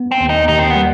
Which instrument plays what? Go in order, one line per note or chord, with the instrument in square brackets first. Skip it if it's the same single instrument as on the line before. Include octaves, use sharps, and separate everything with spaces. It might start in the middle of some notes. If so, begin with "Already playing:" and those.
Already playing: [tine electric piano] B3
[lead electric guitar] C4
[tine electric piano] D#2
[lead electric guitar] D#4
[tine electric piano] D#2 [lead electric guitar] D#4
[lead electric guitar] C4
B3
[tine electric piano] G3